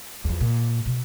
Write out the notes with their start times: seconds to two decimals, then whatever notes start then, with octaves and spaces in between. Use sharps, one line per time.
0.24 E2 F3
0.41 A#2
0.86 B2